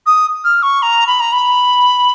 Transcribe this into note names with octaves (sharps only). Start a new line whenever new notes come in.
D#6
F6
C#6
A#5
B5
A#5
B5